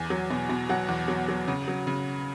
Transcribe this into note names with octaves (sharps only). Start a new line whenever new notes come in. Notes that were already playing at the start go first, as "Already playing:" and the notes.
Already playing: E2 G#5
F#3
B2
B2
F#3 F#5
E2
F#3
F#3
C#3
F#3
C#3